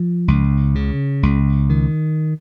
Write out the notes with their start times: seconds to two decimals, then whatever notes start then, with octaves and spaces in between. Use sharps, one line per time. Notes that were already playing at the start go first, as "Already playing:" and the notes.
Already playing: F3
0.28 C#2
0.75 C#3
1.23 C#2
1.70 D#3